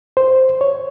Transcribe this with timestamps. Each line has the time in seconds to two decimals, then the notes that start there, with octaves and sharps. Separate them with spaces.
0.17 C5
0.61 C#5